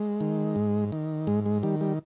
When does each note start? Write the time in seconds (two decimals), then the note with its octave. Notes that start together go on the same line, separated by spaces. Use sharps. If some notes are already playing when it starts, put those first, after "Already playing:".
Already playing: G#3
0.21 D#3
0.56 G#2
0.92 D#3
1.27 G#2 G#3
1.46 G#3
1.63 D#3 G3
1.81 G3